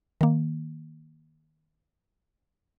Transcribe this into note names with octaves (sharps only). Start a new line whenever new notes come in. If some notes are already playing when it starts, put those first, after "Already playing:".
D#3 A#3